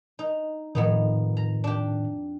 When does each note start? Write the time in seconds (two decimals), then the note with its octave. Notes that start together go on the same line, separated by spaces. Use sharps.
0.19 D#4
0.75 F2 A2 D#3 B3 D#4
1.37 A#5
1.64 D4 G4